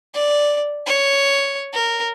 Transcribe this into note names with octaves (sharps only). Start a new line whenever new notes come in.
D5
C#5
A#4